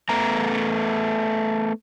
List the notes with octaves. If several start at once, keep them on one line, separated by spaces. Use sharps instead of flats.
A3 B3 A#5